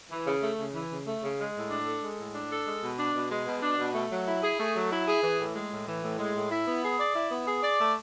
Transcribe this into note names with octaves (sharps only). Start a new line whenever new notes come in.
E3
C#3
A3
C#3
E3
C#3
A3
C#3
G#3
A2
D4
A4
G#3
A2
D4
A4
G#3
B2
D4
B2
G#3
B2
D4
B2
A3
F#3
E4
G#4
A3
F#3
E4
G#4
E3
A2
G#3
A2
E3
A2
G#3
A2
E4
B3
G#4
D5
E4
B3
G#4
D5
A3